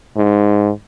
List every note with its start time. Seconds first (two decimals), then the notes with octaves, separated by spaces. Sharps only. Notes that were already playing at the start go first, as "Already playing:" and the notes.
0.17 G#2